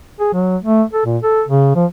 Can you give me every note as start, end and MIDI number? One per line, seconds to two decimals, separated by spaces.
0.20 0.29 68
0.33 0.57 54
0.63 0.83 57
0.93 1.05 69
1.05 1.18 46
1.23 1.43 69
1.48 1.71 49
1.75 1.85 53